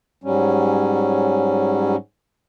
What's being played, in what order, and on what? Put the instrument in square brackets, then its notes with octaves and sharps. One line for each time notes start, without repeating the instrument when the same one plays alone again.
[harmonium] G#2 F#3 G3 C#4